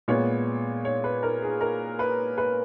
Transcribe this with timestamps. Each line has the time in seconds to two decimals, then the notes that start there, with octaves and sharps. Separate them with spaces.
0.08 A#2 G#3 B3 C#5
0.85 C#5
1.04 B4
1.23 A#4
1.42 G#4
1.61 A#4
1.99 B4
2.38 B4